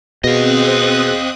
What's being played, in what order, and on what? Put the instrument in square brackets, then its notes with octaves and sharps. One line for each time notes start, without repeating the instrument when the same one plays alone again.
[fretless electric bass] B2 [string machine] C4 D#6 F#6 [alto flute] G#4 [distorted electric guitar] D#5 F5